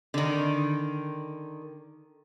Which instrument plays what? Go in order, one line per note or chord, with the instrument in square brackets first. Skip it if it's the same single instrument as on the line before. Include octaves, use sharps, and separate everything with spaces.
[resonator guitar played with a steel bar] D3 D#3